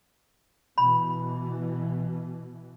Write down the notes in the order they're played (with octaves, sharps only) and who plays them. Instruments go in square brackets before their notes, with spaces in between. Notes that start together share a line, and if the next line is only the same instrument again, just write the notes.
[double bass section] B2 E3 [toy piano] B5